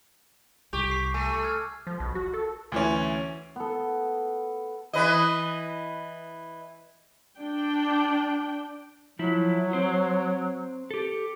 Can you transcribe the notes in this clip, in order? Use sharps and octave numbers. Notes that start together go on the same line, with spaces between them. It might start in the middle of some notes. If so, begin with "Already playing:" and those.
C2 G4 C#6 D6 G6
C#6 C7
A3 G#5 C#6 D#7
F6 G#6
F3
B1
F#4
A4
D2 E3 C#4
B3 A4
E3 B4 D#5
D4 G5
F3 F#3 E4
C4 C5
G4 A4